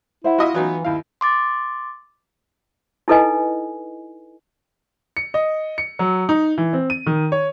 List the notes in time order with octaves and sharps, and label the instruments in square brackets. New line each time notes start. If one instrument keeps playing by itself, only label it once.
[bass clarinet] E4 [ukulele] C5 E5 F#5
[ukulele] F4 [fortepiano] F#4 D#5 E5
[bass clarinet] E3 [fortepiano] F#3 B3 D#4
[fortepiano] D#2 F5 [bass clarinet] E4
[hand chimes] C6 D6 A6
[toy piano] D#4 E4 A4 B4 D#5 G#5
[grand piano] C#7
D#5
C#7
F#3
D#4
E3
C4
D#7
D#3
C#5